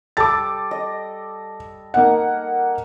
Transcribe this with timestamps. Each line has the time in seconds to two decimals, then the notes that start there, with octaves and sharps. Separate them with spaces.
0.17 G3 A4 D6 A6
0.71 D#5
1.94 A#3 D#4 F#5